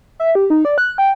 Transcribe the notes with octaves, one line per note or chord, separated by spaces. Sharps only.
E5
G4
D#4
D5
F#6
G5